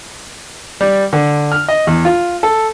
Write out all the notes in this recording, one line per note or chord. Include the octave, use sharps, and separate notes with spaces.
G3
D3
F6
D#5
E2
F4
A4